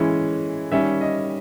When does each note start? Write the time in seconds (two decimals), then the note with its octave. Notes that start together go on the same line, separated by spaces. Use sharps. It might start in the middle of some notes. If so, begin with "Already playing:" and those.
Already playing: E3 G#3 C#4 E4
0.72 D#3 G3 C#4 E5
1.01 D#5